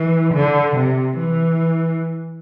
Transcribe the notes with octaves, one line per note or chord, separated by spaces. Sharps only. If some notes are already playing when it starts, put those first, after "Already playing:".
Already playing: E3
D3
C3
E3